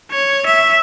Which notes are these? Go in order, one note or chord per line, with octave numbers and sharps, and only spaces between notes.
C#5
E5